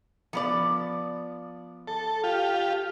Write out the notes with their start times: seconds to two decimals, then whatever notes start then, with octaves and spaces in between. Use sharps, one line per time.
0.33 F3 B3 D5
1.88 A4
2.24 F4 G4